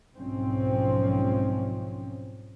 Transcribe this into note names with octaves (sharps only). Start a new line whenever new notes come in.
B1 G#2 F3 C4 C#4